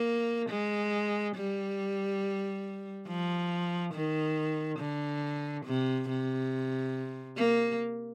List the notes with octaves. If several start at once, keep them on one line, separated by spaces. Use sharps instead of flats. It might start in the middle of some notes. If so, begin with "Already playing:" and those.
Already playing: A#3
G#3
G3
F3
D#3
D3
C3
C3
A#3